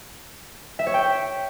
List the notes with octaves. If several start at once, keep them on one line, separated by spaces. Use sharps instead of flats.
E5
C#5
G5